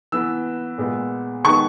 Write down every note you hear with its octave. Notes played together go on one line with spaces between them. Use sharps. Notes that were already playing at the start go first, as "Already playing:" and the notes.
E3 B3 E6
A#2 G#3 B3
D#3 G#3 B3 C#6